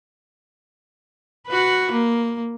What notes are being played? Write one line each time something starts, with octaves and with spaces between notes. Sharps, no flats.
F#4 B4
A#3